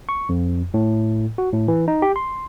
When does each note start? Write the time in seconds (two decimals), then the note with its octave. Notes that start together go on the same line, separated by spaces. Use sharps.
0.09 C#6
0.29 F2
0.74 A2
1.38 F#4
1.52 A2
1.68 E3
1.88 D#4
2.02 G4
2.16 C6